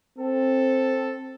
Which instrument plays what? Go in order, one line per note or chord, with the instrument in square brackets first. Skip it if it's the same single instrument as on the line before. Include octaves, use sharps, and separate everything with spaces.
[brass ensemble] C4 A4